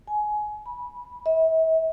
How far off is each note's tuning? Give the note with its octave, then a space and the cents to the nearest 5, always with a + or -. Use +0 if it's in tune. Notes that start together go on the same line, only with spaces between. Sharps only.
G#5 +20
B5 -20
E5 -40